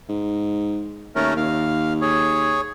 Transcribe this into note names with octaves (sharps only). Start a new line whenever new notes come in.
G#2
D#2 A3 C#4 A#4
D#2 F5
G#4 C#5